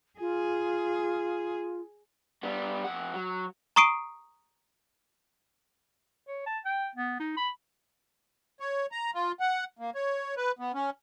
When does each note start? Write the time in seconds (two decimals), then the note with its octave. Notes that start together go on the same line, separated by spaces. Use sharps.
0.20 F4 G#4
2.43 G3 B3
2.84 F2 F#5
3.14 F#3
3.76 A#5 C#6 D#6 C7 D7 D#7
6.28 C#5
6.47 A5
6.65 G5
6.96 B3
7.20 D#4
7.37 B5
8.60 C#5
8.92 A#5
9.15 F4
9.40 F#5
9.79 A#3
9.95 C#5
10.37 B4
10.59 B3
10.74 C#4